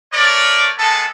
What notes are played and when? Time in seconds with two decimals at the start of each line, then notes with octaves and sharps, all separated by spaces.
0.12 A3 A#4 C#5 D5
0.78 G#3 A#3 B3 G#4 A4 A5